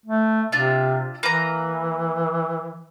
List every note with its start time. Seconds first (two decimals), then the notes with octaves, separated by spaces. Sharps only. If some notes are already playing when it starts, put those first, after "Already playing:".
0.05 A3
0.52 C3 D4 F4 E5
1.23 E3 A#3 B4 A#5